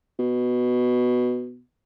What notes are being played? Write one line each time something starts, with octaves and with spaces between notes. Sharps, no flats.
B2